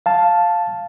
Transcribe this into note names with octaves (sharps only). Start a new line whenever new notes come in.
F5 A5